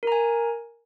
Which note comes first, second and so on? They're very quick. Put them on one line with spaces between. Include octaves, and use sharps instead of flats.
A#4 A#5 G#5